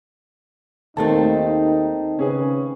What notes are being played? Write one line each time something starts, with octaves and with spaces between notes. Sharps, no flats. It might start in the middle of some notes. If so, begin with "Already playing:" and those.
D#2 D#3 A3 C4 D#4 A5 A6
C#3 C#4 G#4 B4